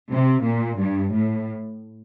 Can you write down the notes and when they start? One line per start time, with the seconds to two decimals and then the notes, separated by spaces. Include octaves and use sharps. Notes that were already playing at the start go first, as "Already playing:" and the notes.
0.12 C3
0.45 A#2
0.79 G2
1.14 A2